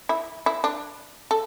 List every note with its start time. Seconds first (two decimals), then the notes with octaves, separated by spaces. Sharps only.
0.09 E4
0.46 E4
0.64 D4
1.31 A4